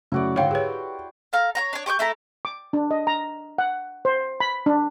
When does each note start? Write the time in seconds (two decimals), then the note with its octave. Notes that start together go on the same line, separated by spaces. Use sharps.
0.12 F#2 C#3 A3 E4 F#4 D5
0.36 G#2 D3 F#4 C#5 F5 G5 C6
0.51 G4 G#4 B4 C#5
1.33 A4 F5 A#5
1.55 C#5 F#5 A#5
1.73 D4 C#5
1.86 G4 C#6 D6 G6
1.99 A3 E4 A4 A#5
2.45 D6
2.73 D4
2.91 D#5
3.07 A#5
3.58 F#5
4.05 C5
4.40 B5
4.66 D4